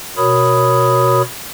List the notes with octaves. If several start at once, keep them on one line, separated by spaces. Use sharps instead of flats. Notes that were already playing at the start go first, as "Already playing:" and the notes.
B2 F#4 A#4 C#5 B5 D#6